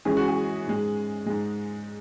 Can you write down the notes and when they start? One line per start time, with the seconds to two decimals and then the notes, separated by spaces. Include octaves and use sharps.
0.05 F#2 E3 G#3 G#4
0.17 F#4
0.28 G#4
0.66 G#2 G#3
1.26 G#2 G#3